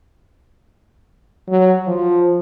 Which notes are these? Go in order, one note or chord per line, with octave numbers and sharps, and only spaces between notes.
F#3
F3